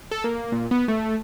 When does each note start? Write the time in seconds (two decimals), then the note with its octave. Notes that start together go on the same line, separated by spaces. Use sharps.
0.11 A4
0.24 A#3
0.52 A#2
0.71 B3
0.88 A3